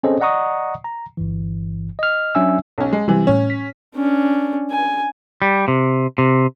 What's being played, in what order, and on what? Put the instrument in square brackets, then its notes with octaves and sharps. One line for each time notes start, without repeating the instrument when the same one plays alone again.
[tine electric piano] C4 C#4 G#4 A4 C5 D#5
D5 D#5 F#5 A#5 C#6 D#6
A#5
G1 G2 E3
D#5 F6
F#3 C#4 D4 E5 G#5 E6
[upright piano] B1 C#4
G#3
[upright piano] C3 E3 [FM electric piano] G3
[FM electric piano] A2 C#5 [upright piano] C#4
[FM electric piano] B6
[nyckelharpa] C#4 D4
G#5
[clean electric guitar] G3
C3
C3